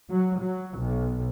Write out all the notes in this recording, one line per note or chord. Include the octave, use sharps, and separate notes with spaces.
F#3
F#3
B1